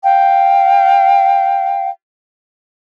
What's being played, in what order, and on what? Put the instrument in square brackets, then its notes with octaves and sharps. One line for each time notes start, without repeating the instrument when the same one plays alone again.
[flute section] F5 G5